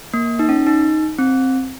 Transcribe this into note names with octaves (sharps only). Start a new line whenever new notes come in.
A#3
D#4
C#4
D#4
C4